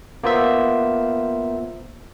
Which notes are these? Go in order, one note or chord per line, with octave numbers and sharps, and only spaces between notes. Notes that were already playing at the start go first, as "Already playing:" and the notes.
A#3 B3 F4 C5 E5